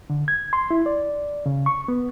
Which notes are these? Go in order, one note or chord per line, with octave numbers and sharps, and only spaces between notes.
D3
G#6
C6
E4
D5
C#3
C#6
B3